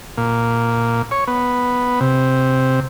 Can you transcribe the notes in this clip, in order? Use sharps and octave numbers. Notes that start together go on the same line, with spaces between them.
A#2
C#5
B3
C3